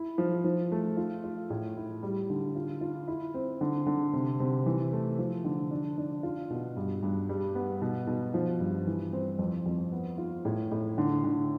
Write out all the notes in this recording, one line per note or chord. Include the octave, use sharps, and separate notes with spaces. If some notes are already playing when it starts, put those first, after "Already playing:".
Already playing: E4
F3
F3
A3
F4
F4
A2
E4
G3
D3
F4
F4
E4
C4
D3
D3
C3
C3
E3
A3
F3
D3
D4
D4
F4
B2
G2
G2
G3
B3
B2
B2
F3
G2
E3
C4
F2
F2
B3
F4
A2
A2
D3
D3